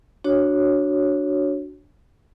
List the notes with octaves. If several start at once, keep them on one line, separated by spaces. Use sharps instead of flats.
D4 F#4 C#5